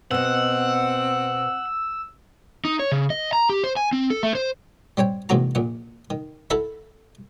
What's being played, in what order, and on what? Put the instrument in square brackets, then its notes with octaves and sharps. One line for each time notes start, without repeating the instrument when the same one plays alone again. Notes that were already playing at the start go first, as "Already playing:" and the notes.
[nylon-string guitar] B2 D#5 [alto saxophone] C4 [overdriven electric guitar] F#5 [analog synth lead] E6
[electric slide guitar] D#4
C#5
C#3
D#5
A#5
G4
C5
G#5
C4
A4
A3
C5
[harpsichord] G3 C4 C#5 G5
E2 G#2 C3 A#3 F#4 A#5
A#1 A#2 F#5
D#3
E4 A4 A#4 E5 F#5 B5